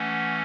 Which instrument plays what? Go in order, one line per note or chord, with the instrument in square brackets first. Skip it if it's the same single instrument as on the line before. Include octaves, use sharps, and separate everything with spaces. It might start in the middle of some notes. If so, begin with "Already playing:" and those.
Already playing: [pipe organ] E3 A3 C#4 F#5